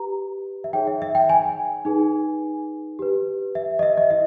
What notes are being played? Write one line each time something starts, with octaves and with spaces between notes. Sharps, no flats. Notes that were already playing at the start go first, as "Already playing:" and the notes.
Already playing: G4 B4 A#5
E5
D#4 G#4 C#5 G5
E5
E5
G5
G#5
D#4 G#4 B4
G4 B4
E5
D#5
E5
D#5
E4 E5